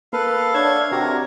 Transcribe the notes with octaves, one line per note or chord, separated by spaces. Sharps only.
A#3 A4 B4 F5
D4 C#5 E5 F#5 G#6
C3 D4 F#4 G4 A#4